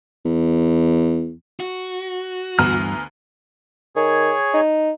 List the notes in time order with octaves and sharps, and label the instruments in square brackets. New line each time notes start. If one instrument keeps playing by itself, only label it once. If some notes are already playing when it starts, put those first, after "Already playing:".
[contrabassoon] E2
[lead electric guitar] F#4
[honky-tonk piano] D2 B3 A#5 [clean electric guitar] G2 E3 [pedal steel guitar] F6
[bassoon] D#3 [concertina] G#4 C#5
[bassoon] D#4